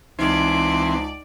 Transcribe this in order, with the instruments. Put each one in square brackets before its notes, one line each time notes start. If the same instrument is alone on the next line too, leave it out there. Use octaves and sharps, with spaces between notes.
[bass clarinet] C#2 [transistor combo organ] E3 C4 [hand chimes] D#4 [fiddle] D5